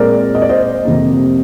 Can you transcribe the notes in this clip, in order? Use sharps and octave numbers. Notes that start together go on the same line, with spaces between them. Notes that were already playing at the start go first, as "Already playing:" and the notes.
Already playing: A#2 G#3 C4 A#4 D5
D#5
D5
C5 D#5
F2 C3 G3 A#3